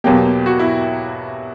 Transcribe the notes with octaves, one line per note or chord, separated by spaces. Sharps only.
E2 B2 F#3 A#3 G4
F#4
E4